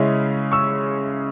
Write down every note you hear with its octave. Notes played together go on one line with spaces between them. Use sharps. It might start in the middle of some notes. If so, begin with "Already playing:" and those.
Already playing: C#3 G#3 C#4 E4
C#6 E6